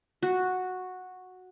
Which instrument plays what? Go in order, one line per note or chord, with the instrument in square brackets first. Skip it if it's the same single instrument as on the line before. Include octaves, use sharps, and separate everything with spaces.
[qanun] F#4